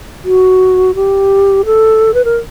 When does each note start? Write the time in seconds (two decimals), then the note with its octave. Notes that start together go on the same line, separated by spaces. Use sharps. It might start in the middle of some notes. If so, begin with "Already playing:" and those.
0.24 F#4
0.95 G4
1.65 A4
2.14 B4
2.25 A#4